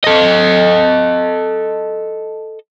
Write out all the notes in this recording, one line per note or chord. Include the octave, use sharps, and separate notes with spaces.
A4 D#5